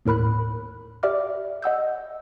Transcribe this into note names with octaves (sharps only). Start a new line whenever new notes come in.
D#2 A2 A#4 B5 F#6
G4 D5 E5 D6 F6
D#5 F#5 E6 G6